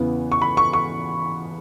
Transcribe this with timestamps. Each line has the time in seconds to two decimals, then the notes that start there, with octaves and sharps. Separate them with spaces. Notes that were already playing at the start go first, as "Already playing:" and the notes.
Already playing: E2 C#3 E3 B3
0.32 C#6
0.42 B5
0.57 C#6
0.73 C#6